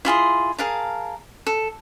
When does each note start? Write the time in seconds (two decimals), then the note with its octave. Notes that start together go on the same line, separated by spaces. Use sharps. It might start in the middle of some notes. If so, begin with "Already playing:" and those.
0.05 E4 F4 G#4 C6
0.58 G#4 A#4 F5 A5
1.47 A4